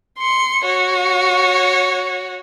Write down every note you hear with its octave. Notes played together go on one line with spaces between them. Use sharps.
C6 C#7
F#4 C#5